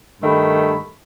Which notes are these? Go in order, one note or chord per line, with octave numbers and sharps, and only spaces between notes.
G2 D#3 A3 B5